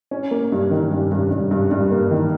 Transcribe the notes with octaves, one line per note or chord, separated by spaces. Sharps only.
C#4
A#3
G2
D#3
G2
G2
G2
G2
G2
A#3
D#3